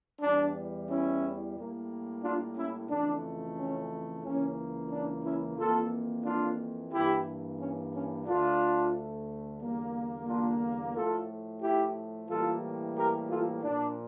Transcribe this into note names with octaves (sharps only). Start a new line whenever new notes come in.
E2 E3 G3 D4
C#4 E4
A2 G3 A#3
D4 F4
C#4 E4
F2 C#3 E3 A3 D4
C#4
C#2 C#3 E3 A#3 C#4
D4
C#4 E4
F2 E3 A#3 F4 A4
D4 F4
G2 E3 A#3 E4 G4
C#4
C#4
D2 D3 A3 D4 F4
E2 D3 G3 A#3
D4 F4
A2 F3 A3 F4 A4
E4 G4
A2 E3 G3 A#3 F4 A4
G4 A#4
F4 A4
A#2 F3 A#3 D4